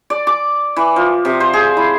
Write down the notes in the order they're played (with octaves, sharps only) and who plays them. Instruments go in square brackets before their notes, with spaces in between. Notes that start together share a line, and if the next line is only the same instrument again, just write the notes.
[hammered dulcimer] D5
D6
E3
F3
C3
C5
G#4
E4